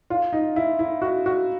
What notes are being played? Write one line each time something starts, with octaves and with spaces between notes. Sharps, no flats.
F4
D#4
E4
E4
F#4
F#4